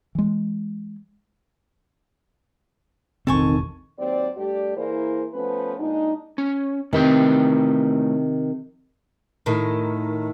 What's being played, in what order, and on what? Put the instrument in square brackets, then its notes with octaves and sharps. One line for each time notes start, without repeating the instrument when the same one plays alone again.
[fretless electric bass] E3 G#3
[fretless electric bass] E1 A1 [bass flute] D#3 [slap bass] C4 [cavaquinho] A4 G#5 C#6
[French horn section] D#2 F#3 C4 D5
G2 A3 G4 D5
E3 A#3 E4 G#4 A#4 C5
F3 A3 B3 C#4 B4
A#2 G#3 D4 D#4
[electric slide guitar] C#4
[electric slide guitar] A2 B4 G5 [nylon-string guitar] C3 D#3
[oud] A2 D#3